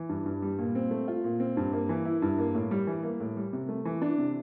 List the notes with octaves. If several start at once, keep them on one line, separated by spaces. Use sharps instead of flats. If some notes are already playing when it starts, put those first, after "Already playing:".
Already playing: E3
G2
G2
G3
A#2
C4
A3
F4
A#2
C4
G2
A#3
E3
E4
G2
A#3
A2
G3
E3
A#3
A2
G3
C3
A3
E3
D4
C3